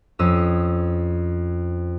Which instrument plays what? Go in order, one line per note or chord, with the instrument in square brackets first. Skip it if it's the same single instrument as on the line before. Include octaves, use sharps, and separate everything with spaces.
[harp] F2 C#4 D#6 E6